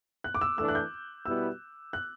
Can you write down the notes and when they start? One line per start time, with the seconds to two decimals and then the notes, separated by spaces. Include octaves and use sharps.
0.24 F#6
0.35 D6
0.41 E6
0.58 E3 A3 D4 A4 E6
0.68 F#6
0.75 G6
1.25 B2 G3 B3 E4 E6
1.93 F#6